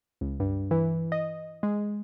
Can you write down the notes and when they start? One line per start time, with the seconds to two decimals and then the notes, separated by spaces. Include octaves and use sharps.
0.21 C#2
0.40 G2
0.71 E3
1.12 D#5
1.63 G#3